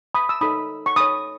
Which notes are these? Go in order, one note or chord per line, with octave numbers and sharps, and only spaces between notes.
B5 D#6
E6
D#4 A4 C#5 B5 D#6
C#6
D#4 A4 C#5 B5 D#6